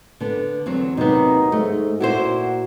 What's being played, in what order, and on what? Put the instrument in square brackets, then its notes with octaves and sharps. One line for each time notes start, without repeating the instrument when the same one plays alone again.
[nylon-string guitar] D3 B3
E2 F#3 C4
[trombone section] D#2 F#3 D#4 [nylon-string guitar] C3 B3
[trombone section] G#2 [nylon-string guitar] A3
[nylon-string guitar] A#2 E4 C5 [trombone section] F#4